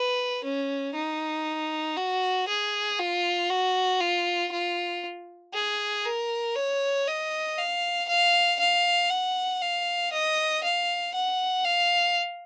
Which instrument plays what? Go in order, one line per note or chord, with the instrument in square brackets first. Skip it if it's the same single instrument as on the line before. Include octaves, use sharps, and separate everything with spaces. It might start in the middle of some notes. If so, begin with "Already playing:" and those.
Already playing: [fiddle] B4
C#4
D#4
F#4
G#4
F4
F#4
F4
F4
G#4
A#4
C#5
D#5
F5
F5
F5
F#5
F5
D#5
F5
F#5
F5